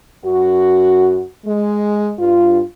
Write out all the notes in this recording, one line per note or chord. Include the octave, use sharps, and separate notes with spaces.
F#2 F#4
G#3
G2 F4